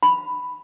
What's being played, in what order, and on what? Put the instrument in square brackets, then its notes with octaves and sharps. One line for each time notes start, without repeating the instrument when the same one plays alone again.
[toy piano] B5